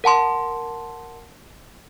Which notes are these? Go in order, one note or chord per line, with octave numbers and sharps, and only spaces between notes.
A#4 F#5 A5 C6